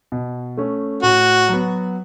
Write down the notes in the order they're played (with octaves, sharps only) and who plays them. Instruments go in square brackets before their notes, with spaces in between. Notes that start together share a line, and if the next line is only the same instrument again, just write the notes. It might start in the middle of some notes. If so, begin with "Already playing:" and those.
[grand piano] B2
A3 C#4
[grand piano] A2 [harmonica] F#4
[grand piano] F#3 B3